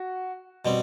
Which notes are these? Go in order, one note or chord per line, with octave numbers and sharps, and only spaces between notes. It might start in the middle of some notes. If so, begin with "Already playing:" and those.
Already playing: F#4
B2 G3 C4